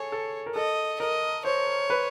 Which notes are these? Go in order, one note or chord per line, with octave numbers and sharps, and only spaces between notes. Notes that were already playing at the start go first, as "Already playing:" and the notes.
Already playing: G#4 A4 C#5
A4
A#4
A4 D#5
A#4 D#5
C5 C#5
B4